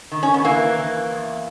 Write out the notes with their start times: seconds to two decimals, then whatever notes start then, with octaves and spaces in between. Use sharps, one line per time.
0.12 D#3
0.23 C#4
0.34 B3
0.44 E3 A#3
0.78 E3
1.11 E2